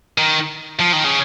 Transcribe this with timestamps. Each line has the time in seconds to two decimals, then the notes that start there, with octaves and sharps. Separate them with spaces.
0.18 D#3
0.80 F3
0.93 D#3
1.05 C#3